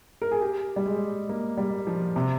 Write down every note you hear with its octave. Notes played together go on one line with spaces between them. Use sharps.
A#4
G#4
G4
G3
G#3
A#3
G3
F3
C3